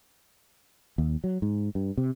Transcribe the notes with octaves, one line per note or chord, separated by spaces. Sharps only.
D#2
F#3
G#2
G2
C3